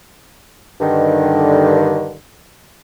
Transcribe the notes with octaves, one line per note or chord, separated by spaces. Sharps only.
G2 D3 D#3